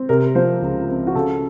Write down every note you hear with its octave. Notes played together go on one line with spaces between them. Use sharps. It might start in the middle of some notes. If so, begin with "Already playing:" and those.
Already playing: C4
C3 A#4
F3 C5
C#2
C4
F#4
C#3 A4